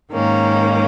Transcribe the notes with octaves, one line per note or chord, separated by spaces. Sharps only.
G#2 D#3 A#3 C#4